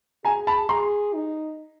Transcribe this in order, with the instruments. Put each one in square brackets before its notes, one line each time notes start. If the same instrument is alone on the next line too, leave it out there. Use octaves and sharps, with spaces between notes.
[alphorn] G#4 [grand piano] G#5 A#5
[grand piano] A5 B5
[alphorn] G#4 [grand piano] A#5 C6
[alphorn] D#4